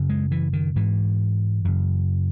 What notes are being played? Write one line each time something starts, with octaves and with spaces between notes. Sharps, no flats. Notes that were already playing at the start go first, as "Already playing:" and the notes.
Already playing: F#2 C#3
G#3
E3
D#3
G#2 E3
F#2 C#3